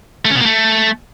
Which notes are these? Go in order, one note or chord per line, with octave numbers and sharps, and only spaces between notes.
A3
C#4
B2
A#3
A3